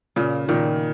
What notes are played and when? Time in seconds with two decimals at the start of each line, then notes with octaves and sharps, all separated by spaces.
0.16 A#2 C#3
0.49 A#2 D#3